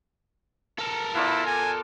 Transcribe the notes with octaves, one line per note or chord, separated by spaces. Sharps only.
A4 A#4
B3 E4 F4 D5
G#5